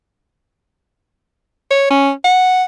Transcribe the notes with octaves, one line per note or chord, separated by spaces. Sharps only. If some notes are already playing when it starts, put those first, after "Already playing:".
C#5
C#4
F#5